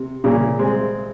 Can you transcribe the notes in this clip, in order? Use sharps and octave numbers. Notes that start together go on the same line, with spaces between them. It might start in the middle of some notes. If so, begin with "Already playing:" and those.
Already playing: C3
A#2 C#3
G#3 C4